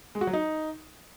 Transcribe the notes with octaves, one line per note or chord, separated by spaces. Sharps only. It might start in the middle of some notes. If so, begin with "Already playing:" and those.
G#3
F#4
F#3
D#4